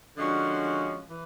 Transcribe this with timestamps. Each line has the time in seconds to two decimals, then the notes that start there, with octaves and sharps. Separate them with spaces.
0.16 D3 F3 G#3 C#4 F#4
1.10 E3